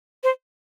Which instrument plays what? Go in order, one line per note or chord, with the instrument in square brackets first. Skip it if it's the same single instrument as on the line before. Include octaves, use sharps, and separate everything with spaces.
[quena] C5